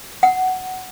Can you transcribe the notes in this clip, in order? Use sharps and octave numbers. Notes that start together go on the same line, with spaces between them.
F#5